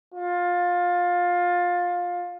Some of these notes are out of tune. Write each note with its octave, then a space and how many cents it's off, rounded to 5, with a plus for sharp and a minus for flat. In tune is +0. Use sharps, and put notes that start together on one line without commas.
F4 +20